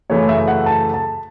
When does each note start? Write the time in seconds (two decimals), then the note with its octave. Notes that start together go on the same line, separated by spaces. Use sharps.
0.10 F#2 C#3 E3 A3 C#5
0.29 E5
0.48 F#5
0.66 A5
0.94 A5